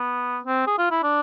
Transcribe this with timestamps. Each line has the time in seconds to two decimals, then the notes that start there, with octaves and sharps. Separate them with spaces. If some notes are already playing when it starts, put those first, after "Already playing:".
Already playing: B3
0.45 C4
0.67 G#4
0.79 F4
0.91 E4
1.03 D4